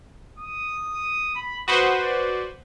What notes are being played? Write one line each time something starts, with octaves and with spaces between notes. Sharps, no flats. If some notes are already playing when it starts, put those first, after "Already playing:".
D#6
B5
F#4 B4 C5 D#6
D5